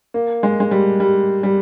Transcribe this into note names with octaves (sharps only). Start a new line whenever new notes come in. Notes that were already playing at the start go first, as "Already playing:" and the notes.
A#3
G#3
G#3
G3
G3
G3